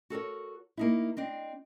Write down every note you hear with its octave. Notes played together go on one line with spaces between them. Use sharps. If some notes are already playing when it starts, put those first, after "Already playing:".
F#4 A4 A#4 C#5
A#3 D#4 E4
C4 D4 D#5